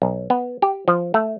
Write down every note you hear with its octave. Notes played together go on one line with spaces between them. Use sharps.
B1
B3
G4
F3
A3